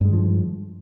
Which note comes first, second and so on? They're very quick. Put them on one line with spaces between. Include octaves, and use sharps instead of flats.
G2 G#3 D#3 F3